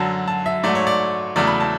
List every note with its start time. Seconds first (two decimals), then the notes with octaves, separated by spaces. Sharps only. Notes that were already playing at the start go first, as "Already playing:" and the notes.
Already playing: F#2 D3 F#3 A5
0.28 A5
0.46 E5
0.63 G#2 F#3 A3 D5
0.75 C#5
0.87 D5
1.36 E2 C#3 F#3 A3 D5
1.47 B5
1.60 A5